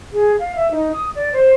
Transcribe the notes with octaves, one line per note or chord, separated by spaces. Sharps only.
G#4
F5
E5
D#4
D#6
D5
C5